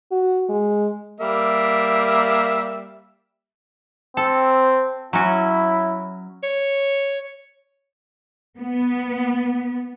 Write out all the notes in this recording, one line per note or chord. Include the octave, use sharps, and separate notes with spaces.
F#4
G#3
G3 A#3 E5
C4 A4
F#3 C#4 E4 F#4
C#5
B3